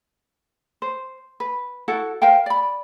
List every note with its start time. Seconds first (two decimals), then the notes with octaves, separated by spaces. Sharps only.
0.82 C5
1.40 B4
1.88 E4 F#4 A4 F#5
2.22 A#4 C5 F5 G5
2.46 D5 B5